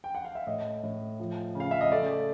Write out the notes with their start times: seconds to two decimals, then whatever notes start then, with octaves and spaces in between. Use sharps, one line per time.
0.04 G5
0.15 F#5
0.25 F5
0.35 E5
0.47 A2 D#5
0.83 A2
1.20 F3
1.55 C#3
1.60 F5
1.71 E5
1.81 D#5
1.91 A3 D5